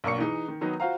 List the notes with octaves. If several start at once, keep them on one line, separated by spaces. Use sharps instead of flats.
B1 A#3 D4 C#6 C#7
E3 D#4 G#4
D#3
D#3 F#3 B3 D#4
F4 F#4 C5 F5 A#5